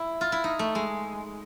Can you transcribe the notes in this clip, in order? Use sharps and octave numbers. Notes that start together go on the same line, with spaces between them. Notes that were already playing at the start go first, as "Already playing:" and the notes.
Already playing: E4
F4
E4
D#4
A3
G#3